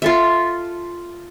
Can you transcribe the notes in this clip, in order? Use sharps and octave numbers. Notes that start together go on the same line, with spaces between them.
F4 A4 E5